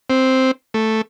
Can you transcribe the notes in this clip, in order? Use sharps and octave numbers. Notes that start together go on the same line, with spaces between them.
C4
A3